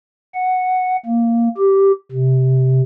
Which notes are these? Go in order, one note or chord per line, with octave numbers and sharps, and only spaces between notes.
F#5
A#3
G4
C3